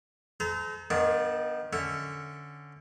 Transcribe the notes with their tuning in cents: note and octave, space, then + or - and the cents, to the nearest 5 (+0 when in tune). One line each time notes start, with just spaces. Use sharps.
A4 -40 C5 -35 A#5 +0
D#3 +0 B3 -40 D4 +0
D3 +0 C#4 +0 E5 +0